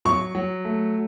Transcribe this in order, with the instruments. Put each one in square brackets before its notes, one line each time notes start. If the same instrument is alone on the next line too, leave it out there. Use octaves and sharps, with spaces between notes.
[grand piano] F#3 [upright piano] C#6
[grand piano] F#3
A3